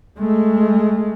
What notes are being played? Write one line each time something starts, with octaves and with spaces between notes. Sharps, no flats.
G#3 A3